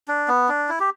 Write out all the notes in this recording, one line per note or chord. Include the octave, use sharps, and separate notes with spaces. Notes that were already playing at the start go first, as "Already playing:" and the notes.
D4
B3
D4
E4
G4